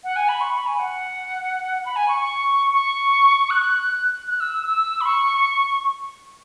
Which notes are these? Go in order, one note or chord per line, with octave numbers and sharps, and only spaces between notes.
F#5
G#5
B5
C#6
B5
G#5
F#5
B5
G#5
C#6
C#6
C#6
F#6
F#6
E6
E6
E6
B5
C#6